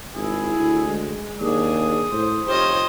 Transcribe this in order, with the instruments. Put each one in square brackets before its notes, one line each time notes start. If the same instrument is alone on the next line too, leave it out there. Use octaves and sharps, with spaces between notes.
[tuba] G#1 [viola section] E4 [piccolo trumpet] G#4
[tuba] D2
[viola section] G#3
[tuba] D#2 [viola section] D4 G#4 [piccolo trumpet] D#6
[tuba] A2 [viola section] C5
[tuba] F1 [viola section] F4 G4 C#5 [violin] C5 D#5